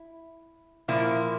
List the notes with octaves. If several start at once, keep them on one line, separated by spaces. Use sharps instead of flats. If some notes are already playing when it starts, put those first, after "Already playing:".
Already playing: E4
A#2 F3 A#3 E4